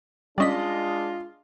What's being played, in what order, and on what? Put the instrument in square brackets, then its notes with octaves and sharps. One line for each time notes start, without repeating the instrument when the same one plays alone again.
[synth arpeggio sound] G3 C#4 B6 [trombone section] G#3 D4 F4 [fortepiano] D5 D#5